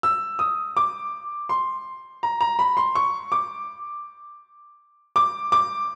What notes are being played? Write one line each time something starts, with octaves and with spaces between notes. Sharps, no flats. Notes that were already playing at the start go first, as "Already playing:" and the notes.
E6
D#6
D6
C6
A#5
A#5
B5
C6
C#6
D6
D6
D6